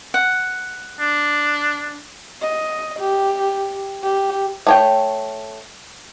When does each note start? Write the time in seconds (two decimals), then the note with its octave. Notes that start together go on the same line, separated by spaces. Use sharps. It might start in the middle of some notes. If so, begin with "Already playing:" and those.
0.14 F#5
0.99 D4
2.41 D#5
2.99 G4
4.03 G4
4.67 A3 C#5 G5